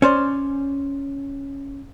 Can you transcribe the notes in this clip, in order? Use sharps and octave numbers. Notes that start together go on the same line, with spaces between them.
C#4 C5 D5